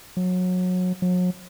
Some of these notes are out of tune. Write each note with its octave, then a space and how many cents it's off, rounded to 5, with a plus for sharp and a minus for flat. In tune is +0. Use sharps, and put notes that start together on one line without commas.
F#3 -25
F#3 -40